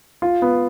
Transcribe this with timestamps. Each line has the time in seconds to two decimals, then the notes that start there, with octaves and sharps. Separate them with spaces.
0.22 F4
0.42 B3